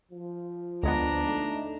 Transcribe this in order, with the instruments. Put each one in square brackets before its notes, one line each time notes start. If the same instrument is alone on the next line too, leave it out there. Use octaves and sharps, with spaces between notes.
[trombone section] F3
[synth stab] D2 G#3 B3 [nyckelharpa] D4 A#5
[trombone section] A3 D#4